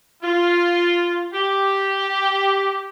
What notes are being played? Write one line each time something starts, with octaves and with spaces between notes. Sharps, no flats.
F4
G4